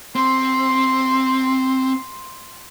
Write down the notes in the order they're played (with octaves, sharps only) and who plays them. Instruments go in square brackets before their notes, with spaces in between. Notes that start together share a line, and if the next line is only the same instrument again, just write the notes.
[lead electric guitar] C4 [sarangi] C6